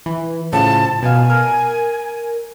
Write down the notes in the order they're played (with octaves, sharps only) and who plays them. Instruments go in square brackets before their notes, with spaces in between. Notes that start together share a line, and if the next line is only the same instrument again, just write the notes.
[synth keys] E3
[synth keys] A2 C#3 F3 [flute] A5
[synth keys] B2 F5 [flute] G#5
[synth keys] A#4